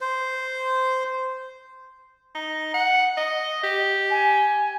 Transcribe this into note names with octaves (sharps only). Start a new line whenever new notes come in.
C5
D#4
F#5
D#5
G4
G#5